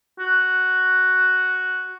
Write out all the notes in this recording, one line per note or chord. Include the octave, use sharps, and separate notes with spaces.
F#4